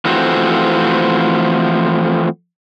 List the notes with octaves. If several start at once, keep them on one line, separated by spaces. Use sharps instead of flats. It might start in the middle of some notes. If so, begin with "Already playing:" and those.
E3 F3 A3 C4 F#4